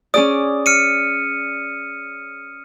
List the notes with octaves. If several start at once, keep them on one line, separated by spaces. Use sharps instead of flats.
C#4 G#4 D5 D#6
F6 C#7 D#7